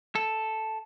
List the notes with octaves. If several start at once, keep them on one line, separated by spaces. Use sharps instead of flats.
A4